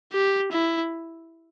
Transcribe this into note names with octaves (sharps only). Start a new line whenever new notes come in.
G4
E4